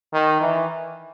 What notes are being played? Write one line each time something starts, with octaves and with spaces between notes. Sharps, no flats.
D#3
E3